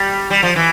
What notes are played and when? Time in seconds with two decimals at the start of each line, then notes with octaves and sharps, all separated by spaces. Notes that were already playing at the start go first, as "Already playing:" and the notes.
Already playing: G3
0.30 G3
0.43 F3
0.56 E3